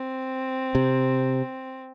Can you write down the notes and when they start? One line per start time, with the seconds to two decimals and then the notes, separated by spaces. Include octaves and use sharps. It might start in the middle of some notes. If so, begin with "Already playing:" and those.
Already playing: C4
0.75 C3